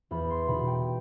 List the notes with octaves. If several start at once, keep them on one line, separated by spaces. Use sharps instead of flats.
E2 B5
C6
B2 G3 D#4 B5
G5